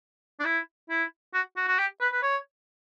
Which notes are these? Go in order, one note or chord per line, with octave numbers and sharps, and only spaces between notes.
D4
E4
E4
F#4
F#4
F#4
G4
B4
B4
C#5